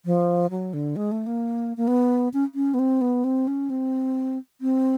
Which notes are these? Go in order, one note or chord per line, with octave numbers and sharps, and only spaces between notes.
F3
F#3
D3
G#3
A3
A#3
A#3
B3
C#4
C#4
B3
C4
B3
C4
C#4
C4
C4